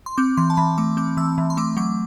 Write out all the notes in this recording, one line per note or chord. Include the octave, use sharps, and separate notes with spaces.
C6
C4 D6
E3 C6
A5
E3 B5
A3 D6
C4 D6
E3 E6
E3
C6
A3 D6
F#3 D6